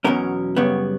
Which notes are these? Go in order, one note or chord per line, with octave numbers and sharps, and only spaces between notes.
E2 B2 F#3 C#4 A#4
F#2 C#3 G3 B3 C#5